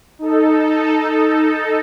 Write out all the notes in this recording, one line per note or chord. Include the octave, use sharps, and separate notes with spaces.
D#4 A4